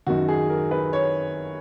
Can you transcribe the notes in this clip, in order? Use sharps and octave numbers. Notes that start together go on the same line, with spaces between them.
F#2 D#3 F#4
G#4
A#4
B4
C#5